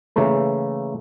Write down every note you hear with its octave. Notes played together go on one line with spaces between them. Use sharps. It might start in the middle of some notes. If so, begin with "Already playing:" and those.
C#3 E3 A3 A#3 A4